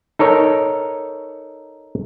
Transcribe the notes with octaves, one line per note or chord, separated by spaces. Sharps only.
D#4 A4 A#4 C#5